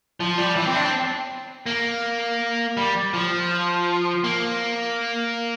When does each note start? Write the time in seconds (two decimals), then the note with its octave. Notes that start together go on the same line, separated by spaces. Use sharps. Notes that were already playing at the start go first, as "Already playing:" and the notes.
0.20 F3
0.38 G3
0.56 E3
0.66 C4
0.75 D4
0.84 C4
1.66 A#3
2.77 G3
3.14 F3
4.24 A#3